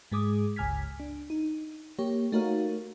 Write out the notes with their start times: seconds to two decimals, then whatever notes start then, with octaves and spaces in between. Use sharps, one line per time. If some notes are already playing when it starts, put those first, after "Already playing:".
0.12 G#2 G#3 G#4 D6 D#6
0.56 G1 C#2 G#5 F6 G#6 B6
1.00 D4
1.30 D#4
1.99 A#3 G4 C#5
2.32 A3 D#4 F#4 A#4 C#5 F5